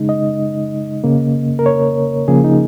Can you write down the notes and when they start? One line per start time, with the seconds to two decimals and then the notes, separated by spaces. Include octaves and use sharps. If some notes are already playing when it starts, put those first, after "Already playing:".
Already playing: C#3 G#3 D#4
0.09 D#5
1.04 C#3 A#3
1.59 A#4
1.66 C#5
2.28 C#3 F3 A#3 G#4
2.44 D#4